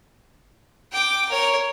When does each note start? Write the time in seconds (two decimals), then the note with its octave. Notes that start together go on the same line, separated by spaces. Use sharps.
0.93 G5 D6
1.29 A#4 C#5